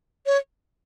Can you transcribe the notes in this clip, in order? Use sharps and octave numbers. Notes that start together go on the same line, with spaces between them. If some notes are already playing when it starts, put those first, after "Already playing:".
C#5